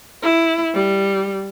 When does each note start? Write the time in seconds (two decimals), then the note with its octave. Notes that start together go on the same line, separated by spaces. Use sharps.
0.22 E4
0.74 G3